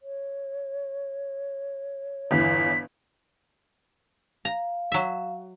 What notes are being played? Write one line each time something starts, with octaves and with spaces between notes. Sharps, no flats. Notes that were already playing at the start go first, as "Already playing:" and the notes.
C#5
G1 E2 E3 B6
F5 A#5
F#3 E5